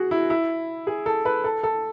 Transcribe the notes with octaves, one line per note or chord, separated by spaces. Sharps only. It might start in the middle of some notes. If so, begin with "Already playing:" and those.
Already playing: F#4 G#4
E4
E4
G#4
A4
B4
A4
A4